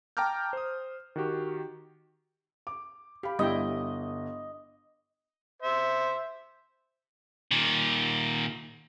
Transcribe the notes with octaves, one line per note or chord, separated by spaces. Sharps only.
G5 A5 A#5 D6 F6 G6
C5 D#6
D#3 F#4 G4
D6
G4 F5 B5
G1 G3 E4 D#5 G5
C5 E5
A#2 D#3